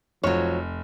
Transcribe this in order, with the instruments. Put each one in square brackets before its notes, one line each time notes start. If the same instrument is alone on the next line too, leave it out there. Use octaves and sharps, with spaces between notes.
[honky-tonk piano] F1 [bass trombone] F3 [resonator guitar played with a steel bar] F#3 C#5